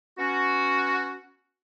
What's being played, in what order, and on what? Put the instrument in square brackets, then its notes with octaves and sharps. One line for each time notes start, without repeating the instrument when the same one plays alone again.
[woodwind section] B3 C#4 F#4